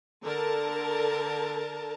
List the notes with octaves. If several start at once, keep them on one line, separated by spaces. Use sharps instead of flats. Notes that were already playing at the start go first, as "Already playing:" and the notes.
D3 A#4 A5